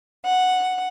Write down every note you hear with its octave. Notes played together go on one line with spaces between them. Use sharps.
F#5